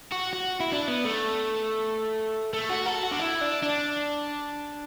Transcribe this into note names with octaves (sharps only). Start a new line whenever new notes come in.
F#4
F#4
E4
D4
B3
A3
A3
F#4
A4
F#4
D4
E4
D4
D4